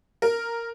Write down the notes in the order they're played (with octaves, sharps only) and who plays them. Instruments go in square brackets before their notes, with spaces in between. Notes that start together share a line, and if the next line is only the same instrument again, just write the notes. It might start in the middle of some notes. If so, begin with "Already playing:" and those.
[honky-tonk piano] A#4